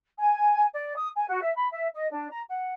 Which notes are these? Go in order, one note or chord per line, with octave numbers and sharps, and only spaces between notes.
G#5
D5
D#6
G#5
F#4
E5
B5
E5
D#5
D4
A#5
F#5